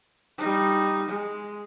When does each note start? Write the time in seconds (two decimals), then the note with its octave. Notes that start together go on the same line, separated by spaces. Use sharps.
0.38 G3 D#4
1.09 G#3